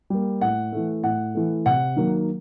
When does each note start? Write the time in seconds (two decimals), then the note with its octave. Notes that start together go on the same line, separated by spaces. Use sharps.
0.10 G3 A#3
0.41 A2 F#5
0.72 E3 A3
1.03 A2 F#5
1.35 E3 A3
1.66 C3 F#5
1.96 D#3 F#3 A#3